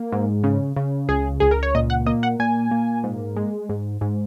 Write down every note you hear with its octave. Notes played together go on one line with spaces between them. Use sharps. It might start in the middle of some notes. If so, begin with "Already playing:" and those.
Already playing: A#3
G#2
C#3
C#3
C#2 G#4
C#2 G#4
A#4
C#5
A#2 D#5
F#5
A#3 D#5
F#5
A#2 G#5
A#3
G#2
G#3
G#2
G#2